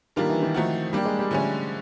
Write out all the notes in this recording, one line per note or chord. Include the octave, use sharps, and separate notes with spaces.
D#3 G3 A#3 D4 F4 A#4
E3
D#3
F3 A3 C4 D#4 F#4
G3 A#3 D4 G4
G#3
G3
D3 F3 A3 C#4